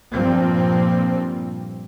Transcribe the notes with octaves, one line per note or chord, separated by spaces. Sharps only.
G2 A#2 F3 G3 A#3 C4